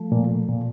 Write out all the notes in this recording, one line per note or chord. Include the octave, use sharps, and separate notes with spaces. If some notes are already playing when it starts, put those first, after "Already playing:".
Already playing: F3 A3
A#2
A#2